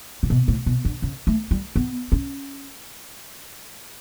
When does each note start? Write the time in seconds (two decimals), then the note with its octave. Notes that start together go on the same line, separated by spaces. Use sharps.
0.23 C#3
0.30 B2
0.48 A2
0.66 B2
0.85 D3
1.02 C#3
1.27 A3
1.51 G3
1.76 B3
2.12 C#4